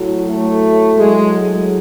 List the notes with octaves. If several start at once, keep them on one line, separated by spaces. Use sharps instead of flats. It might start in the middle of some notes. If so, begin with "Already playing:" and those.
Already playing: A2 F#3
A3
A2 F#3 G#3